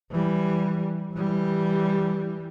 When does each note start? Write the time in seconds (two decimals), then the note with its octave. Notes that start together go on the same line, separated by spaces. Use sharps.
0.11 E3 G3
1.14 E3 G3